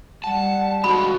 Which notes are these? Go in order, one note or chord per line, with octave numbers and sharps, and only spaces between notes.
G3 F#5 A5
D3 F3 G#3 F#4 B5